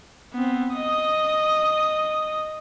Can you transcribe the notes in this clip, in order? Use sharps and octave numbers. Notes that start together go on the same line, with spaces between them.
B3 C4
D#5 D#6